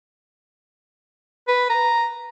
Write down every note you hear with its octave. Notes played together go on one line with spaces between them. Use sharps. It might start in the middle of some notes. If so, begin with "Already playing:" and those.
B4
A#5